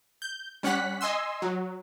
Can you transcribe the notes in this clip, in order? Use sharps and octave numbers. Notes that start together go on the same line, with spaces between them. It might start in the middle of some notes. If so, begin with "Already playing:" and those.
G6
G3 C#4 F#5 F#6 B6
D#5 G#5 C6 E6
F#3